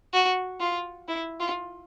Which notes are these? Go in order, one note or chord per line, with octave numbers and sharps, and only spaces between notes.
F#4
F4
E4
F4